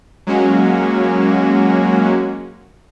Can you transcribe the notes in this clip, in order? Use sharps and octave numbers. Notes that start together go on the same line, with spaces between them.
F#3 G#3 A#3 C#4 F#4